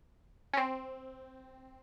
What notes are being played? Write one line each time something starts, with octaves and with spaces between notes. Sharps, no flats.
C#4
C4